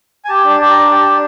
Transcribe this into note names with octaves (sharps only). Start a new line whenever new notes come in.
G#5
G4 A5
D4
A5
G4 A5
A#5
D4
G4 A5
D4